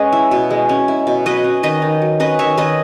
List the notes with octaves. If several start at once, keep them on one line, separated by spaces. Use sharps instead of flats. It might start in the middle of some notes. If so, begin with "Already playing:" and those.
Already playing: G#3 C#4 B4 D#5
E4
B2
G#3
C#4
E4
B2
F#3 B4 D#5
C#4
D#3 B4 D#5
D#3
F#3
C#4 B4 D#5
D#3 C#5 E5
D#3 B4 D#5